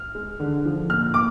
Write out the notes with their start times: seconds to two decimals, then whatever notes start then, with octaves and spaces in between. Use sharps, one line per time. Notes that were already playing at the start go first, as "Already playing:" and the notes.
Already playing: F6
0.15 G#3
0.40 D3
0.65 F3
0.89 A#2 F6
1.14 A#2 D6